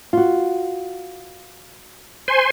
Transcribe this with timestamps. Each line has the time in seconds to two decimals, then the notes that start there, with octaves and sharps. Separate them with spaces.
0.13 F4 F#4
2.28 C5 G#5 C6